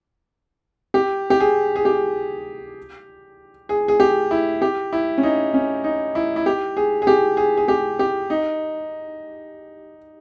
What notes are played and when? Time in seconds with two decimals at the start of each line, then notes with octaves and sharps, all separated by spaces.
0.94 G4
1.30 G4
1.40 G#4
1.75 G#4
1.85 G4
3.69 G#4
3.88 G#4
4.00 G4
4.31 E4
4.62 G4
4.93 E4
5.18 C#4
5.23 D#4
5.54 C#4
5.84 D#4
6.15 E4
6.36 E4
6.46 G4
6.77 G#4
7.02 G#4
7.07 G4
7.37 G#4
7.57 G#4
7.68 G4
7.99 G4
8.30 D#4